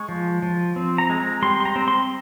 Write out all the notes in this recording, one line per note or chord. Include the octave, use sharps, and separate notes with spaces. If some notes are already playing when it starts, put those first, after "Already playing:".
Already playing: G#3 C#6
F3
F3
C4
A#5
G#3
A#5
G3 C6
C6
A#5
C4
C6